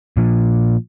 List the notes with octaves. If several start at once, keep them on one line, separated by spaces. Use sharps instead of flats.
A#2 F3